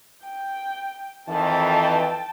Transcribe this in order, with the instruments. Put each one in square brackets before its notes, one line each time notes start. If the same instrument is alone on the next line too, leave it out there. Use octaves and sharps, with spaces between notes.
[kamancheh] G5
[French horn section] F2 D#3 E3 [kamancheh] G5 A5